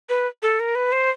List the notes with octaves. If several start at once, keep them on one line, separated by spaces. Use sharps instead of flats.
B4
A4
A#4
B4
C5